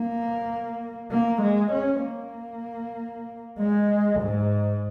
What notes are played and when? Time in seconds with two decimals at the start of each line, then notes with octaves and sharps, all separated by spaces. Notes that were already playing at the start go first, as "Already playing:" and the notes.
Already playing: A#3
1.11 A#3
1.42 G#3
1.73 C#4
2.04 A#3
3.59 G#3
4.21 G#2